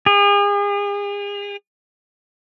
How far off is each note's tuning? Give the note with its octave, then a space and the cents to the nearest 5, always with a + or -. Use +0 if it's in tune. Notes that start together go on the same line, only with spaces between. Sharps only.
G#4 -40